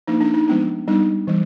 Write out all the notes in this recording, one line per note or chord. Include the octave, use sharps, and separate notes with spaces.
F3 A#3 D4 D#4
D4
D#4
F3 G#3 B3 D4
G3 B3 D4 D#4
E3 G3